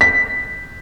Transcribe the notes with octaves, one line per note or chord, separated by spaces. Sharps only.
B6